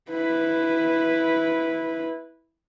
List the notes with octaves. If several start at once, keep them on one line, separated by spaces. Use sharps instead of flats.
E4 B4